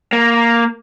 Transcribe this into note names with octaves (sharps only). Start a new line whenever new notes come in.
A#3